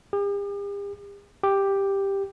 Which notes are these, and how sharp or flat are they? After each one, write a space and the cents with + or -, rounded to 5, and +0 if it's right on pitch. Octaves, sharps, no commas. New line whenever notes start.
G4 +45
G4 +5